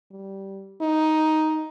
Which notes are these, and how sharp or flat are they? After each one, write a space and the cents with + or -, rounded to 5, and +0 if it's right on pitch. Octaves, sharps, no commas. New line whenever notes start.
G3 -10
D#4 +5